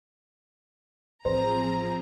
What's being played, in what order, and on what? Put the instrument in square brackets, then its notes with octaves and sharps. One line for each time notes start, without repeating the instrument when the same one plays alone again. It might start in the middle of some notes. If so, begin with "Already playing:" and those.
[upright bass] A1 [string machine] F3 C4 G#4 [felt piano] C5 [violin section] A#5